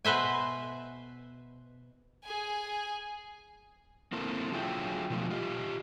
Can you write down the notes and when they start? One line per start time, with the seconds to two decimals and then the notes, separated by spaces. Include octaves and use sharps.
0.05 B2 B4 C5 E5 G#5
2.24 G#4 G#5
4.13 A#3 C4 E4 A4 A#4
4.52 D3 F#3 F4 G#4 E5 G5
5.10 B2 F3 A3 F4
5.31 F4 G4 D#5